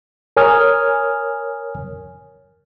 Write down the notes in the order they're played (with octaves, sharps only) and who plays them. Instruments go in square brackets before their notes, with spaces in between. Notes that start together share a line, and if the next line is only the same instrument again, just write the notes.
[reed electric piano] A#4 C#5 G#5 D#6 F6